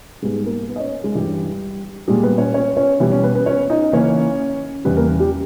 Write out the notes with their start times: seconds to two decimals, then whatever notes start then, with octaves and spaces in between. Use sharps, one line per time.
0.22 G#2 G3 G#3 B3 G#4
0.46 A#3 A#4
0.69 B3 B4
0.76 D#5
0.80 C#4 C#5
1.04 G#3 G#4
1.15 G2 E3 G3 G4
2.08 A#2 G3 G#3 A#3 G#4
2.23 B3 B4
2.38 C#4 C#5
2.54 C#4 C#5
2.77 C#4 C#5
3.00 B2 E3 G3 B3 E4
3.12 C#4
3.24 B3 B4
3.35 B3 B4
3.46 C#4 C#5
3.70 D#4 D#5
3.92 C#3 E3 A#3 C#4 C#5
4.85 E2 C#3 G3 B3 B4
4.97 A#3 A#4
5.20 G3 G4